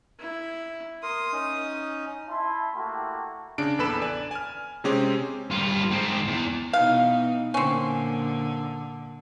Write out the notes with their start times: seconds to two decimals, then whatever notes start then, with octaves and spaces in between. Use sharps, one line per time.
0.19 E4
1.03 A#4 C6 D#6
1.32 C#4 D#4
2.29 E4 A5 C6
2.75 A3 A#3 E4 F#4 G4 A4
3.58 C#3 D4 D7
3.78 A#1 E2 A4 B4 B5 E7
4.02 D5 G#5
4.31 G#5 F6
4.84 C3 G#3 C4 C#4 G4 G#4
5.51 G2 F4
5.91 G#2 C4
6.28 E2
6.73 B2 E3 D#4 F5
7.54 A#2 D3 C4 C#4